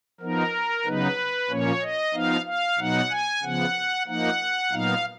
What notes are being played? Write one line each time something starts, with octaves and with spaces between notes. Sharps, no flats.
F3 B3 D#4 A#4
C#3 F#3 B3 D#4 B4
A#2 F3 A#3 C#4 C#5
D#5
F3 B3 D#4 F5
F5
B2 F#3 B3 D#4 F#5
G#5
C#3 F3 B3 F#5
F3 A#3 D#4 F#5
A#2 F#3 B3 D#4 F5